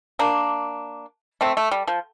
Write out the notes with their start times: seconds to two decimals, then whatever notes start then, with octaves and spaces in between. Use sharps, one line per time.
0.19 A#3 D4
1.41 A3 C4
1.57 A3
1.71 G3
1.87 F3